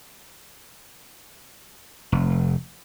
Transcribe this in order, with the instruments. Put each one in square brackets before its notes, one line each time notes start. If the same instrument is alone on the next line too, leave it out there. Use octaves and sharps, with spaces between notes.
[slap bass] F1